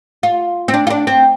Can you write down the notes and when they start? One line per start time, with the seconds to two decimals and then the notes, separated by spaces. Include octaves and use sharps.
0.23 F4
0.68 C4
0.74 D4
0.87 F4
0.90 D4
1.07 C4